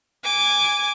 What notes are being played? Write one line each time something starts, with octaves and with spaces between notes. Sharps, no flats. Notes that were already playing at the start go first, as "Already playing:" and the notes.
G#5 D6